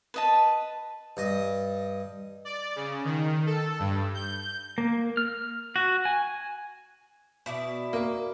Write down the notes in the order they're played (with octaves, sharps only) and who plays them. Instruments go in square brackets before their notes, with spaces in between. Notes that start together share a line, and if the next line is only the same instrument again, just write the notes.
[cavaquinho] B4 D#5 A5
[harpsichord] G2 D#5
[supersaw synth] D5
C#3
D#3
A4
G2
G6
[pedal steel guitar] A#3
F6
F#4
G#5
[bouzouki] B2 E4 D5
[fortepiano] A#3